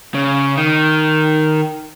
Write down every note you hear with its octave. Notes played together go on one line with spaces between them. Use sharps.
C#3
D#3